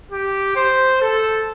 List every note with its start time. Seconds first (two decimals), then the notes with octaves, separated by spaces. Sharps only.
0.11 G4
0.56 C5
1.02 A4